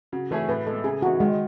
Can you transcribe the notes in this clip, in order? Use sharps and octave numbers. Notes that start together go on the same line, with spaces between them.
C#3 F#4
E3 A3 C#4 G#4 A4
A2 B4
G#3 B3 A4
C#3 G#4
E3 B3 D#4 F#4
D#3 G#3